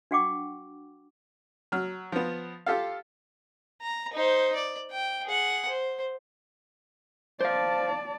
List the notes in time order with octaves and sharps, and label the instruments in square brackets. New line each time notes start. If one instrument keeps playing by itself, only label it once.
[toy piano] D4 F#4 F#5 G5 C#6 D6
[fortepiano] F#3 F6
F3 B3
F4 G4 A4 F5
[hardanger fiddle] A#5
D#4 C5
D5
G5
G#4 F#5
C5
[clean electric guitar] C5 F5 [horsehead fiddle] D5 A5